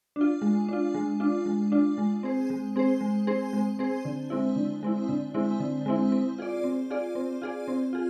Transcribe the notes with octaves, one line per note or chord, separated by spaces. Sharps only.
D4 F4
G#3
D4 F4
G#3
D4 F4
G#3
D4 F4
G#3
C4 G#4 C5
G#3
C4 G#4 C5
G#3
C4 G#4 C5
G#3
C4 G#4 C5
D3
G#3 C4 E4
D3
G#3 C4 E4
D3
G#3 C4 E4
D3
G#3 C4 E4
C4
F4 G#4 D5
C4
F4 G#4 D5
C4
F4 G#4 D5
C4
F4 G#4